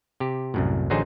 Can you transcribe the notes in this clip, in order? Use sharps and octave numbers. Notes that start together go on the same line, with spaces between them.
C3 G4
C2 F#2 A2
A1 D3 F#3 D#4 G#4 C5